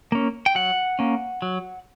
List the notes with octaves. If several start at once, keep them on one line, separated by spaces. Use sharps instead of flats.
A#3 C#4
G5
F#3 F#5
A#3 C#4
F#3